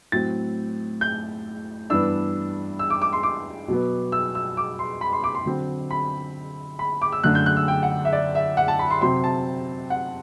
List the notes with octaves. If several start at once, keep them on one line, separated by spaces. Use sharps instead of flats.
A2 F#3 C4 A6
G6
G2 E3 B3 D4 E6
E6
D6
D6
C6
D6
B2 F#3 B3
E6
E6
D6
C6
B5
C6
D6
C6
D3 F#3 C4
B5
B5
D6
E6
F#2 D3 A3 D4 F#6
G6
F#6
E6
G5
F#5
E5
D5
E5
F#5
A5
B5
C6
C3 F#3 C4 C6
A5
F#5